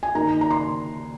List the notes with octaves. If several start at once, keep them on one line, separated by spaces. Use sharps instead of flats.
G#5
D#3 A#3 D#4 A#5
A#5
C6